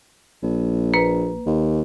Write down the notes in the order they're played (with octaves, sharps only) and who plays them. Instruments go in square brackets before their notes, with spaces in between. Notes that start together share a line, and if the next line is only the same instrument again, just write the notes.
[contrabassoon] A#1
[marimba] A#3 B4
[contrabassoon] D#2